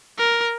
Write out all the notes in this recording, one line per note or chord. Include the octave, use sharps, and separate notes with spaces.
A#4